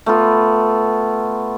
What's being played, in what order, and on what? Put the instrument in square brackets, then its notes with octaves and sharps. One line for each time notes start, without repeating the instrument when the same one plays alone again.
[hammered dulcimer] A3 B3 F4